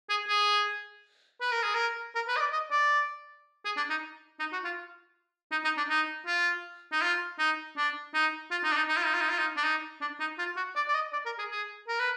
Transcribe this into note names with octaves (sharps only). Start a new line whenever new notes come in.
G#4
G#4
B4
A#4
G#4
A#4
A#4
B4
D#5
D5
D#5
D5
G#4
D4
D#4
D#4
F#4
F4
D#4
D#4
D4
D#4
F4
D#4
F4
D#4
D4
D#4
F4
D#4
D4
D#4
D#4
F4
D#4
F4
D#4
F4
D#4
D4
D#4
D4
D#4
F4
F#4
D5
D5
D#5
D5
A#4
G#4
G#4
A#4
B4